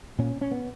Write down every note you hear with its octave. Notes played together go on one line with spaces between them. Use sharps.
A#2 C#4
C#4
B3